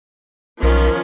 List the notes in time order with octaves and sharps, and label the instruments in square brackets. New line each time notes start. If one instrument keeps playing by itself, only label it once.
[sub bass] B1 [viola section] D#3 F3 C#4